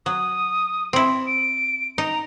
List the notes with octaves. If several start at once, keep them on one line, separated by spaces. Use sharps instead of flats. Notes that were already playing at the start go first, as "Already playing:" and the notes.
F#3 D#6
C4 E4
D7
D#4 A#5